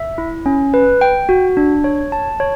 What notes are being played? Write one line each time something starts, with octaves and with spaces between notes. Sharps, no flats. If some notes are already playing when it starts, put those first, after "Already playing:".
Already playing: E5
E4
C#4
B4
G5
F#4
D4
C#5
A5
C#5